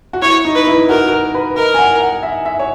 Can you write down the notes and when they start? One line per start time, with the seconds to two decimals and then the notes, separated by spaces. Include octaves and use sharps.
0.13 F#4
0.22 E4 C#5
0.45 D#4
0.55 B4
0.67 E4
0.89 F#4 A#4
1.12 A#4
1.35 B4
1.56 A#4 D#5
1.74 G#5
1.79 F#5
2.00 F#5
2.23 E5
2.45 E5
2.59 C#5